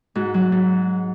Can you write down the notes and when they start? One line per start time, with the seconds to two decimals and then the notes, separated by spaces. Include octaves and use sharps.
0.15 G#2 F#4
0.34 F#3
0.52 G#2